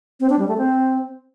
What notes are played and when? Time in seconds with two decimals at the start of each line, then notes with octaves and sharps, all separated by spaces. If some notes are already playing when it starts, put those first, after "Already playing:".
0.20 C4
0.30 D4
0.39 G3
0.48 A3
0.58 C4